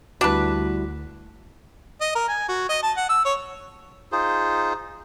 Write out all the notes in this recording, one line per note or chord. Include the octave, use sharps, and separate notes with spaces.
D2 G3 D4 E4 F#4 B4
D#5
A#4
G#5
F#4
D#5
A5
F#5
E6
C#5
D#4 F4 G#4 C5